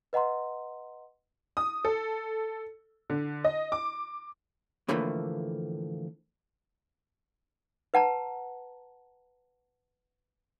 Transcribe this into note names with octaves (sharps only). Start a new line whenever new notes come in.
B4 D#5 F#5 A#5 C6
D#6
A4
D3
D#5
D6
A2 D3 E3 F3 A3 A#3
B4 F#5 A5 A#5